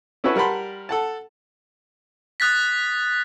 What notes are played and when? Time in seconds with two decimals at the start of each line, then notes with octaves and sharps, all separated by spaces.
0.24 C#4 E4 F#4 A4 B4 C#5
0.36 G3 A#4 F#5 A5 B5 C6
0.89 A4 F#5 A5
2.40 D#6 F#6 A6 B6